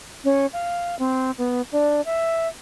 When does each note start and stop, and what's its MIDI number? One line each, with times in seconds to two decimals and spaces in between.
0.24 0.46 61
0.53 0.96 77
0.99 1.31 60
1.38 1.62 59
1.72 2.01 62
2.05 2.48 76